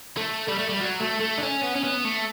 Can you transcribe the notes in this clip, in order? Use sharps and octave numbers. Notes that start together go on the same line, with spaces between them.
A3
G3
A3
G3
F#3
A3
A3
D4
C#4
B3
C#4
B3
A3